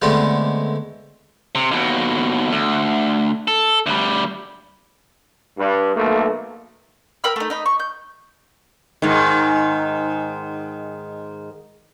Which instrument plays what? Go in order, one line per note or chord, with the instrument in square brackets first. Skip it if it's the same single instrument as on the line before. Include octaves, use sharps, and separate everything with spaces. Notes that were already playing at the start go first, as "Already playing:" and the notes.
[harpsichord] D3 G#3 A3 B3 C4
[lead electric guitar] C3
D#2 B2
D2
A4
D2 G3
[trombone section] G2
B1 A3 A#3
[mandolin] A#4 G5 B5 E6
A3 D#4
D#4 D#5 B5
C#6
G6
[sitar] G#2 D#3